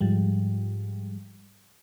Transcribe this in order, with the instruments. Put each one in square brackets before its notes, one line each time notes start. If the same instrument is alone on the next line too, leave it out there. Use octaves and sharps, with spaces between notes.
[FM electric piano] G#2 F3 G3